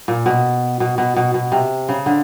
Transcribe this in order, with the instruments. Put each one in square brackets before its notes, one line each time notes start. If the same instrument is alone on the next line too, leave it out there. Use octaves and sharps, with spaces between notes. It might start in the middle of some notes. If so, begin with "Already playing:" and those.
[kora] A#2
B2
B2
B2
B2
B2
C3
C#3
D3